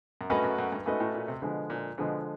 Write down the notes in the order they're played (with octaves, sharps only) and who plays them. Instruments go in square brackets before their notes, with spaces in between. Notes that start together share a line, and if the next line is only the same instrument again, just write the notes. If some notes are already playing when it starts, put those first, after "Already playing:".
[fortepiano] F#2
[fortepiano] G2 [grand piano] A3 C#4 F#4 B4 D#5
[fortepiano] F#2
F#2
G2
[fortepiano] G#2 [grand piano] A3 C#4 F#4 B4 D#5
[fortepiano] A2
A#2
C3
[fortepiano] B2 [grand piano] D3 F3 G#3
[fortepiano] A#2
[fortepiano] B2 [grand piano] D3 F3 G#3